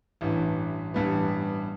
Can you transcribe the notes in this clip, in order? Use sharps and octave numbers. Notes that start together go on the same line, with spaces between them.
A1 G2 E3
A1 G2 G3 B3